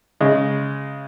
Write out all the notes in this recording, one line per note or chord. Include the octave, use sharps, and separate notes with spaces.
C#3 G#3